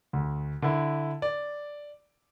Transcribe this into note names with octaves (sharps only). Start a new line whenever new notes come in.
D2
D3 E4
D5